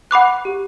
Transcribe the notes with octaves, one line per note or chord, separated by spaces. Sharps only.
F#5 B5 D6 F#6
G4